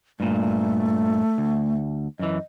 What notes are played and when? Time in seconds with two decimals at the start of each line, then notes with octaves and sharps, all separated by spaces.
0.20 G2 A#2 A3
1.38 D2
2.19 F#2 E3 D#5